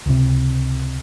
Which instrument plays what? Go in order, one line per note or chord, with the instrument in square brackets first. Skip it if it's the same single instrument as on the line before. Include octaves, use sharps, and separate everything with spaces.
[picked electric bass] C#2 C3